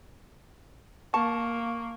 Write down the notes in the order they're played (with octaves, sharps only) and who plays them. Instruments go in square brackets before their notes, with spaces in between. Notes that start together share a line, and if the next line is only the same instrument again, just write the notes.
[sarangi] A#3 [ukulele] A5 [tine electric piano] C#6